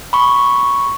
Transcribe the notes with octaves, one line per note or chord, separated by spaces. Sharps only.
B5 C#6